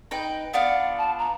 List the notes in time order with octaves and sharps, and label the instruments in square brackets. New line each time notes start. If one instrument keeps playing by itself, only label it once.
[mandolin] D#4 B4 G5
[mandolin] B3 D4 F4 [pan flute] F#5
[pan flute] A5
A#5